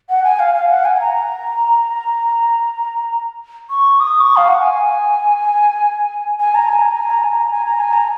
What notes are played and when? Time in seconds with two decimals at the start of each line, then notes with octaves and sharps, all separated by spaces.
0.10 F#5
0.24 G#5
0.39 F5
0.55 F5
0.70 F#5
0.85 G#5
0.96 G#5
1.00 A#5
3.70 C#6
4.00 D#6
4.20 C#6
4.37 F5
4.48 F#5
4.60 G#5
6.40 G#5
6.55 A#5
6.68 G#5
6.82 A#5
6.96 G#5
7.10 A#5
7.24 G#5
7.37 A#5
7.52 G#5
7.65 A#5
7.80 G#5
7.93 A#5